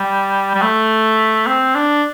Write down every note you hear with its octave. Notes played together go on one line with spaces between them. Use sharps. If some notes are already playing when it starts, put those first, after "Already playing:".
Already playing: G3
G3
A3
C4
D4